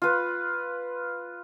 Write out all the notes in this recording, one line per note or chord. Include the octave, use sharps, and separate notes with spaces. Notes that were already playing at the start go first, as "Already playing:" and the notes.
F4 B4